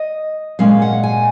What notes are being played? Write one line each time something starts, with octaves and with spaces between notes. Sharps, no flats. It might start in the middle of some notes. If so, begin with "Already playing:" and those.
Already playing: D#5
A#2 G#3 C#4 F5
F#5
G#5